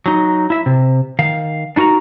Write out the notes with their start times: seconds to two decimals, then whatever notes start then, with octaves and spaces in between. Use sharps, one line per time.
0.06 F#3 D#4
0.50 E4 E5
0.66 C3
1.19 D#3 F5
1.76 D4 D#4 F#4 A#4 A#5